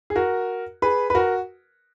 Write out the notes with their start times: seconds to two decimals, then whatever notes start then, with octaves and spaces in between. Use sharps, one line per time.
0.10 G#4
0.15 F#4 A#4
0.82 G#4 B4
1.10 B4
1.15 F#4 A#4